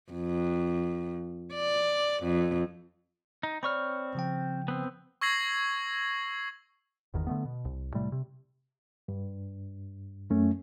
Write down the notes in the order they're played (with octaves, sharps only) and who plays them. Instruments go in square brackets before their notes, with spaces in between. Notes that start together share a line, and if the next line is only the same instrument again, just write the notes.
[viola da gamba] F2
D5
F2
[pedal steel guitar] D#4
[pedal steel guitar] C4 C#6 F6 [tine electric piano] C#5 D5 B5
[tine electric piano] C#3 F3 G5
[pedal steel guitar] B3 C4
[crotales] C#6 E6 G#6 A#6 C7 F#7
[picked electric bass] G1 E2 D#3
D3 A3 B3
B2
C2
A2 C3 G3 A3
C3
[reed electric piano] G2
F#2 A3 C#4